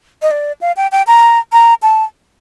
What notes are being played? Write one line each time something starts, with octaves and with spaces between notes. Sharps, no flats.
D#5
D5
F5
G5
G5
A#5
A#5
A5